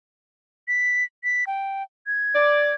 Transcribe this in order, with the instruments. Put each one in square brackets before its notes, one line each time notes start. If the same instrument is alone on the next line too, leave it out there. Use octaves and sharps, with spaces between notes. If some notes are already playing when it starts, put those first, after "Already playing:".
[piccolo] B6
B6
G5
G#6
[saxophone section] D5